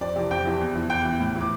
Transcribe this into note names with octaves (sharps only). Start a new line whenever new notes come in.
F2 D5
C3 E3
F2 G5
C3 E3
E2
E3
E2 G5
E3
A2
E3
D6